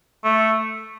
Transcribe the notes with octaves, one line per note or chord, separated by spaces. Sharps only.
A3